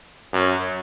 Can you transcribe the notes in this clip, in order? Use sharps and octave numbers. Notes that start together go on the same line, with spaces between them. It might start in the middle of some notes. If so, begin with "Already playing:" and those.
F#2